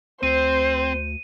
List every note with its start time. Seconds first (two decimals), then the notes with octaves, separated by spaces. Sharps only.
0.23 D2 C4 C5 D#7